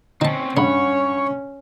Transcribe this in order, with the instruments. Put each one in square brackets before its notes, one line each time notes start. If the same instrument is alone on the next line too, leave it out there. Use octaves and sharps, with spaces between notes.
[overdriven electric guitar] C4 C#4 [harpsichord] D#4 A5
[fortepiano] G2 F#5 B5 [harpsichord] C#3 [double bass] C#4 [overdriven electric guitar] C#5